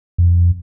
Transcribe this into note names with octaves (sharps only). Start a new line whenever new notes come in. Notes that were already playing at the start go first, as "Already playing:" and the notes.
F2